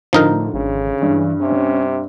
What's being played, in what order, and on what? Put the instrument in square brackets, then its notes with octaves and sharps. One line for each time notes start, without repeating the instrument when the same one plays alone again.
[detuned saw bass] A2 [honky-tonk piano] D3 [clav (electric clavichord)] F3 D#4 A#4
[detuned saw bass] G#1 [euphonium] C#3
[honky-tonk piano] G2 [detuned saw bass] E3
[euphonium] C3 [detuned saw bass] C#4